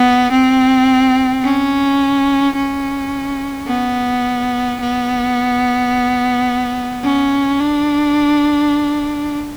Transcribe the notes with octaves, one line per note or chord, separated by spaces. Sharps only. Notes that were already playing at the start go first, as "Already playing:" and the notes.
Already playing: B3
C4
C#4
C#4
B3
B3
C#4
D4